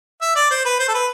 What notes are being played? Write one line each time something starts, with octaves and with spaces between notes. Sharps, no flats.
E5
D5
C5
B4
C5
A4
B4